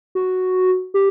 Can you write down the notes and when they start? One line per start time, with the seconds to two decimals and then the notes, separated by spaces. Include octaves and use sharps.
0.15 F#4
0.94 G4